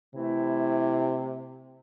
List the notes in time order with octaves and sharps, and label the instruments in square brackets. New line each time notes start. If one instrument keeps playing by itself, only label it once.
[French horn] C3 [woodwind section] E3 A3 E4